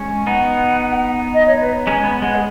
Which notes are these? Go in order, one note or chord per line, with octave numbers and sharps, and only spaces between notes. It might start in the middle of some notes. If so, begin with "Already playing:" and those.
Already playing: G#3 C#4
B3 D#4 F#5
D#5
C#5
B4
G#3 C#4 G#5
B3 B5
G#3 F#5
G#4